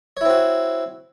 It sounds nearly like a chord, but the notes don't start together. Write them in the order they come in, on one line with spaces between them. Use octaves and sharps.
C#5 E4 C4 F#4